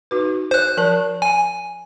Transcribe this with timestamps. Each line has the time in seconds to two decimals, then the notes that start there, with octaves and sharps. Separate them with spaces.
0.11 D#4 F#4 B4
0.51 C5 F#6
0.77 F3 A#4 A5
1.22 G#5